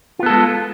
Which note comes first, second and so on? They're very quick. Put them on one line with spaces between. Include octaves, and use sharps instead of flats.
F4 B3 A4 G#3